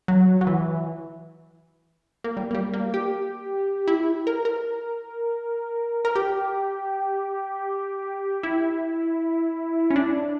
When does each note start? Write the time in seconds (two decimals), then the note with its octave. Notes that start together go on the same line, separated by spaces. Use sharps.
0.08 F#3
0.41 F#3
0.47 E3
2.24 A#3
2.37 G3
2.51 A#3
2.55 G3
2.74 A#3
2.94 G4
3.88 E4
4.27 A#4
4.45 A#4
6.05 A#4
6.15 G4
8.43 E4
9.90 C#4
9.96 D4